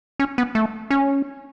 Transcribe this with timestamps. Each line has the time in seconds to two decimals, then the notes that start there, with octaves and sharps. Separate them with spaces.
0.19 C#4
0.38 B3
0.55 A3
0.90 C#4